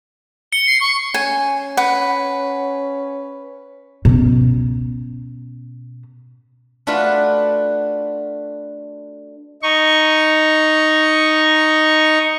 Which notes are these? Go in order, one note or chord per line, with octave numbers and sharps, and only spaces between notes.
C#7 G7
C7
C#6
C#4 G#5
B4 F#5
B2 C#4
A3 D4 F4 F#4 B4
D#4 C#6